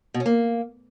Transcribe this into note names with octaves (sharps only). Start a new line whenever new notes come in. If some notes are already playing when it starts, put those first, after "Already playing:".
B2
C#4
A#3